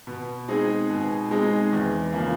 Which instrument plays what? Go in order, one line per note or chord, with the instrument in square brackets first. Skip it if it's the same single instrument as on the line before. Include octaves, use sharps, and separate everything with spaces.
[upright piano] B2
G#3 C4 D#4 G#4
B2
G#3 C4 D#4 G#4
E2
C#3 F3 A#3